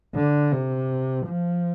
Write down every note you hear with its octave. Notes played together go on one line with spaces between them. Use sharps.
D3
C3
F3